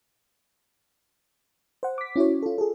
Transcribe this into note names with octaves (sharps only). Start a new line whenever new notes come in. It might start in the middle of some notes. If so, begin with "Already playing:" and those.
C5 F#5
D6 B6
C#4 E4 F#4 C#5
F4 A4
G#4 A4